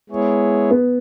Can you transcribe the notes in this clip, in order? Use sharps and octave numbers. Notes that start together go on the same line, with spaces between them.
G#3 B3 E4 G#4 C#5
B3